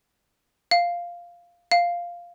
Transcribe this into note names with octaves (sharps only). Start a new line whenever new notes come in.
F5
F5